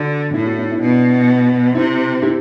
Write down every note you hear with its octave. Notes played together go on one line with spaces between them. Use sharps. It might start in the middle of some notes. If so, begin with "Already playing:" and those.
Already playing: D3 D4 F#4
A2 E4
F#4
E4
E4
B2 D4
C3 E4
E4 G4